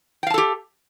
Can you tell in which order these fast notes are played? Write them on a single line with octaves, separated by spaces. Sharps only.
G5 F5 A5 A4 G4